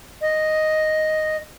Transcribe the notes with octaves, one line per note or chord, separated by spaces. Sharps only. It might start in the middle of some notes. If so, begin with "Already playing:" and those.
D#5